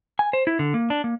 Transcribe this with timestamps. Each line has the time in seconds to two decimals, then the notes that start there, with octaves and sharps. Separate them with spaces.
0.19 G#5
0.33 C5
0.47 E4
0.59 D3
0.74 A#3
0.90 D4
1.04 A#3